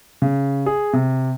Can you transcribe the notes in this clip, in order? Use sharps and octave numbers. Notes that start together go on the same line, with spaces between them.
C#3
G#4
C3